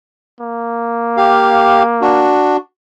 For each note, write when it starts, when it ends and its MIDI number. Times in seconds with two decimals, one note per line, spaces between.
0.40 2.37 58
1.17 1.83 67
1.17 1.83 77
2.02 2.57 62
2.02 2.57 66